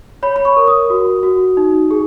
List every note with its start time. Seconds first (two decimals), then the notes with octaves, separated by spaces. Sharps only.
0.23 C#5 B5
0.36 B5
0.45 C#6
0.57 A#4
0.68 D#6
0.90 F#4
1.23 F#4
1.57 D#4
1.91 G#4